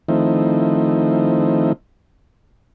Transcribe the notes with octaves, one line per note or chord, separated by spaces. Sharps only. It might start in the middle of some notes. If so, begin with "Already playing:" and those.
D#3 F3 A3 C4 D#4 E4